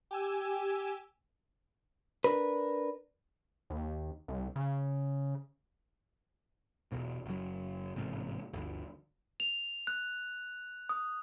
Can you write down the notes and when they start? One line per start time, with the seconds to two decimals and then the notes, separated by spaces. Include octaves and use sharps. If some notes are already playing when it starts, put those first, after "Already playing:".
0.11 G4 G#5 E6
2.24 D4 A#4 B4
3.70 D#2
4.28 C2
4.56 C#3
6.92 E1 B1 B2
7.26 F#1 F#3
7.96 A1 G#2 C3
8.53 G1 D2
9.40 F7
9.87 F#6
10.89 D#6